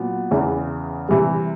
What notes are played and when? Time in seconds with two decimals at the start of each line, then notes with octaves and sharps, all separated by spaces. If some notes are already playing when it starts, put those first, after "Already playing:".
Already playing: A#2 F#3 B3
0.31 E2 C#3 E3
1.09 C3 E3 G3